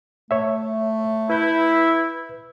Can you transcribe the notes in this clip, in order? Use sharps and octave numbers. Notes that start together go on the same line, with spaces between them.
A3 C#5 E5
E4 B4 G6